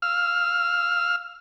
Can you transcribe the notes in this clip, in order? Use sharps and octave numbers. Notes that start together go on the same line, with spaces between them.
F5 E6 F6